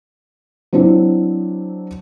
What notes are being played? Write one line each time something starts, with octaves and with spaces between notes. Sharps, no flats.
F#3 C4 D4 E4